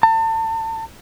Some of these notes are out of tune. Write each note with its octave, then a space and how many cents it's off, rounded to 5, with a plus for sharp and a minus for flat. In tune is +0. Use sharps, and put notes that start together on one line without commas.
A5 +35